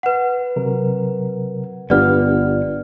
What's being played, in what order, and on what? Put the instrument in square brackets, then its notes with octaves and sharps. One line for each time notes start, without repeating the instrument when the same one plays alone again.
[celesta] B4 F#5
[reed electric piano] C3 F#3 A#4
[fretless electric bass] G1 B3 [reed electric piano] D4 F4 G4 [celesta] D5 F6